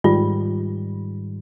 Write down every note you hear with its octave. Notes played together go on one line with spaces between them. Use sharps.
G#2 D#3 G3 F4